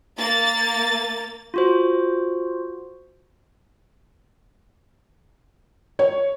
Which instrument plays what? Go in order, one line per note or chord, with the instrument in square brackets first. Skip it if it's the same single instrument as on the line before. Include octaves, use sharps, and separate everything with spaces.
[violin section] A#3 A6
[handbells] F4 F#4 C5
[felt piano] C#5